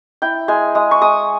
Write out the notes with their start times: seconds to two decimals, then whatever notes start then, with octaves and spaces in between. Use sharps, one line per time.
0.22 E4 G5
0.48 G#3 G#5
0.75 G#3 D#6
0.91 C#6
1.01 G#3 D#6